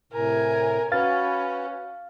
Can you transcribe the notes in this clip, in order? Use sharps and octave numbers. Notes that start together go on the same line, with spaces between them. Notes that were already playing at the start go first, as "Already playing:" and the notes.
A2 C3 A#4 G#5
C#4 F#4 B4 F5 F6 A6